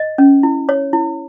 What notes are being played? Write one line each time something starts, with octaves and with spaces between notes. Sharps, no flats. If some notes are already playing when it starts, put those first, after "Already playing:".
Already playing: D#5
C#4
E4
C#5
E4